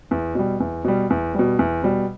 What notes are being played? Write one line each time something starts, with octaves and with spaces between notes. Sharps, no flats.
E2
B2 G3
E2
B2 G3
E2
B2 G3
E2
B2 G3